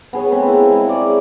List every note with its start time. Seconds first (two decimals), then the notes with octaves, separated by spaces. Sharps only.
0.13 B3 G#4 C#5
0.32 A3 B3 C4 B4
0.47 A#3 E4
0.71 G#3
0.87 C#5 D5